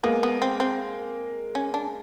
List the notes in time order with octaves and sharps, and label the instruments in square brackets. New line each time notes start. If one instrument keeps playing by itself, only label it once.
[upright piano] G#3 A#3 [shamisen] B3
[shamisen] B3
C4
C4
C#4
D4